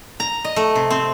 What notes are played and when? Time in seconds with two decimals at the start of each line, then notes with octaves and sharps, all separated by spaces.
0.20 A#5
0.44 D#5
0.56 A3
0.75 C3
0.90 C4